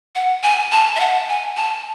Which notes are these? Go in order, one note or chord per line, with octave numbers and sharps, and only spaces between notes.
F#5
G#5
A5
E5
F#5
G#5
A5